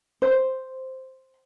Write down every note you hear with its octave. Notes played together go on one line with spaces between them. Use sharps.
C5